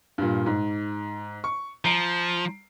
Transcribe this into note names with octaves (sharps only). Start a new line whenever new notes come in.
G2 A#2
G#2
C#6
F3 A#5 C7 D7